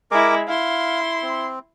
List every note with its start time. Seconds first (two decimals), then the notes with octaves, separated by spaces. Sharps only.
0.11 G#3 E4 A#4 D6
0.47 E4 F5 C6
1.22 C4